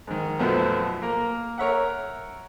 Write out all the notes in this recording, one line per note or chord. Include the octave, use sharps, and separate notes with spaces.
G#2 D#3
B1 F#2 F3 A3 B3 C5
A#3 A#4
A#4 C#5 E5 F#5